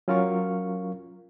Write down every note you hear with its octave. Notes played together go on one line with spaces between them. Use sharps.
F#3 C#4 F4 A#4 F5 C#6